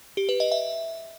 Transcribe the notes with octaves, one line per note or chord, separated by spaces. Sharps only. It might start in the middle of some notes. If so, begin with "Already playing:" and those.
G4
B4
D#5
E5